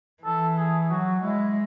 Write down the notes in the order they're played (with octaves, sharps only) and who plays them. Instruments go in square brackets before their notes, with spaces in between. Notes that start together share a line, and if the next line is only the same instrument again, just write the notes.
[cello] E3 [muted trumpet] A4
[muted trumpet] G#4
[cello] F#3 [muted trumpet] F#4
[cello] G#3 [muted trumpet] E4